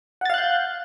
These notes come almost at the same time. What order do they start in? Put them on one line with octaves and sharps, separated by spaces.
F#5 A6 F5 F#6 G6